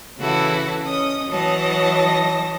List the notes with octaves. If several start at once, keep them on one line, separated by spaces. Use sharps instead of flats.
C#3 E3 E4 F#4 A4
C#4 D#5 D#6
E3 F#3 C#5 D#5 A5 A#6